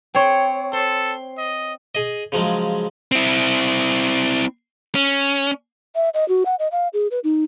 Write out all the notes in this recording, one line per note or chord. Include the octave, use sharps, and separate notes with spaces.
C4 C#5 G5
A4 C5
D#5
G#4 D#5
C#3 F3 F#3 G#3
C4 E4
C#4
E5
D#5
F#4
F#5
D#5
F5
G#4
B4
D#4